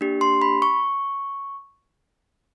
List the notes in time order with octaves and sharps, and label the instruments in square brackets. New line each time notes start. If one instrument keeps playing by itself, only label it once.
[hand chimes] A#3 D4 G4
C6
B5
C#6